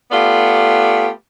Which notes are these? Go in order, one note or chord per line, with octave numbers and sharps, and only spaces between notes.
A3 B3 F4 G4 D5